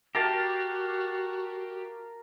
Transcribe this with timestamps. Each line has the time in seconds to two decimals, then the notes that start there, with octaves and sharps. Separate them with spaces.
0.15 F#4 G4 A#4 F5 A5